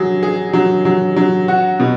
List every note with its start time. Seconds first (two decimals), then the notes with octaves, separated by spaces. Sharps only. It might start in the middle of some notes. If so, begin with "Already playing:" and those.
Already playing: F#3 G#4
0.23 G#4
0.53 F#3
0.85 F#3
1.16 F#3
1.48 F#4
1.80 B2